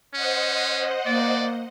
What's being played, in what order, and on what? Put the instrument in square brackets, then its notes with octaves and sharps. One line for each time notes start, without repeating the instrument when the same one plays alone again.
[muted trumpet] C#4 [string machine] C5 D#5 F#5
[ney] A#3 [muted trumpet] D5